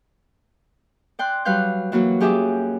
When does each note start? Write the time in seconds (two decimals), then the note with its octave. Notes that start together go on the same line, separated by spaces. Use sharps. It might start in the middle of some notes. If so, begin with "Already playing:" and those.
1.19 D5 G5 C6 F#6
1.45 F#3 G3 B4 F5 F#6 G6
1.92 E3 F#3 A#3 F#4
2.20 F#2 G4 G#4 E5 D6